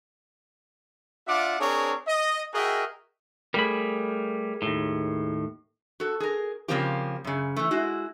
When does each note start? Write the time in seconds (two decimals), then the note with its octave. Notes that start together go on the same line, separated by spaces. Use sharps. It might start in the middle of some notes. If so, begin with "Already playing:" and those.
1.28 D4 F4 E5 F#5 D6
1.59 C4 D4 G#4 A#4 C#5
2.08 D#5
2.54 F#4 G#4 A#4 D#5 E5 G5
3.54 G3 A3 G#4 A#4 B5
4.62 D#2 A2
6.00 F#4 A4
6.20 G#4 A#4
6.68 C#3 F3 A#3 C4 F4 G4
7.24 F#2 C#3
7.56 E3 A3
7.71 G#3 E4 F#4